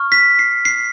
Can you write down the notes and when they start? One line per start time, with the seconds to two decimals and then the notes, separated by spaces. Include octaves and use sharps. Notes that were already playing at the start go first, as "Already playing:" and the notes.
Already playing: C#6 F6
0.12 B6
0.39 C7
0.65 C7